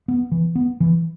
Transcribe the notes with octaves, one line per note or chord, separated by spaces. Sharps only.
B3
E3
B3
E3